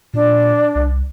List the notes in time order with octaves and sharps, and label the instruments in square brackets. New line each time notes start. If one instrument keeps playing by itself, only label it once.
[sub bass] A#2 [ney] D4
[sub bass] C2